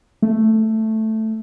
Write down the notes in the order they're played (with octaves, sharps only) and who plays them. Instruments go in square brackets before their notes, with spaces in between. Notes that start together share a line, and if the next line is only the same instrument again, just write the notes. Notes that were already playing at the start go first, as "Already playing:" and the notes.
[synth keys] A3